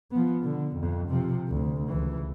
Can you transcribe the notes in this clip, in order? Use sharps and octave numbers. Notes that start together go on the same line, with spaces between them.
F3 B3
D3
F2
C3 F3
D2
C#2 E3